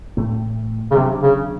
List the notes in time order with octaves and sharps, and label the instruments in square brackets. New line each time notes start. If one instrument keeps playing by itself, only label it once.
[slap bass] A2 E3 A3
[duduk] C#3
[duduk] C3 [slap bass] D#3 F#3 B3 D4
[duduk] C#3